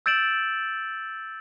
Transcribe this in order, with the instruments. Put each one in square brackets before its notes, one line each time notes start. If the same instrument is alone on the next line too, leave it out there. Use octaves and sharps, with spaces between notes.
[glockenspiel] E6 G6 A6 D7 E7 F#7